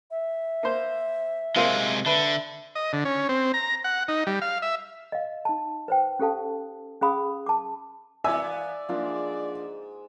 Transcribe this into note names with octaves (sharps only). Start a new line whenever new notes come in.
E5
A#3 C5
C3 G#3 A#3 C4 F4
D3 B4 E5
D#5
D3
C#4
C4
A#5
F#5
D#4
G3
F5
E5
D#5 F5
D#4 A5
B4 C5 G5
C#4 G4 A4 F5 A5
C#4 G#4 F5 B5 D#6
A5 D6
E3 A#3 B3 D5 E5 G#5 E6
G#2 F3 A#3 D4